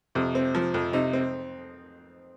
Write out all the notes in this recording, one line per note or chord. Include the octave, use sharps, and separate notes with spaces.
F2 C3
C4
F3
F2
C3 D#4
C4